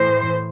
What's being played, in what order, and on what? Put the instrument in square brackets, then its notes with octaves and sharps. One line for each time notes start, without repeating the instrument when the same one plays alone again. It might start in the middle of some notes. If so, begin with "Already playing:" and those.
Already playing: [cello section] A2 E3 C5